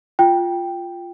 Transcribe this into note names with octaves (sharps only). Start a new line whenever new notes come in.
F4 G5